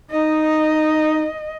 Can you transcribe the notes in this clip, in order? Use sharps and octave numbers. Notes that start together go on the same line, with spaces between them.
D#4 D#5